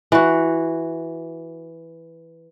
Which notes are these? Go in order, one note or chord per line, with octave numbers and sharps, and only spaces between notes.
E3 F#4